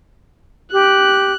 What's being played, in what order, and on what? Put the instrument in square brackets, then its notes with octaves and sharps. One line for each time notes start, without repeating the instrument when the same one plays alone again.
[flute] G4 [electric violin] F#6